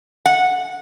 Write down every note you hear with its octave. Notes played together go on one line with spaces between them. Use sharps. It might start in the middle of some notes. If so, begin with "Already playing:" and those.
F#5